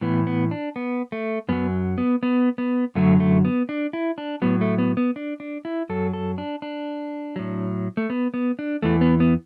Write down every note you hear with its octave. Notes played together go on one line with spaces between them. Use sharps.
A2 E3 B3
B3
D4
B3
A3
F#2 F#3 B3
B3
B3
B3
F#2 D3 F#3 A3
A3
B3
D4
E4
D4
A2 F#3 B3
A3
B3
B3
D4
D4
E4
F#2 F#3 A4
A4
D4
D4
A2 F#3
A3
B3
B3
D4
E2 E3 A3
B3
B3